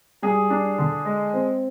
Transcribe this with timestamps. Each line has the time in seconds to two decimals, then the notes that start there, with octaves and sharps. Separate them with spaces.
0.22 G3 G#4
0.50 D4
0.78 D3
1.05 G#3
1.33 C4